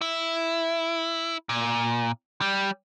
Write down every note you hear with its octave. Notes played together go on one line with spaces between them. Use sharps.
E4
A#2
G3